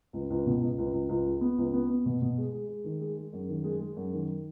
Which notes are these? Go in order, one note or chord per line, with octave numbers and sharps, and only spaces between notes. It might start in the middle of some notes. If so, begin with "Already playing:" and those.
C#2
C#2
B2
C#2
C#2
C#2
C#2
G#3
B3
C#2
B3
B3
B2
B2
G#3
G#3
G#3
D#3
G#3
G#3
F#2
D#3
G#3
G#3
F#2
D#3